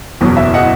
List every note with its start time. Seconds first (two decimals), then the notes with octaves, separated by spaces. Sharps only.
0.21 F#1 E2 B2 F#3
0.37 E5
0.54 D#5 F#5